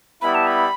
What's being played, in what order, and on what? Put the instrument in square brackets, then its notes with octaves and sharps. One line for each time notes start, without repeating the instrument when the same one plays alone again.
[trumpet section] G3 B3 E4 [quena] B5
[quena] A5
B5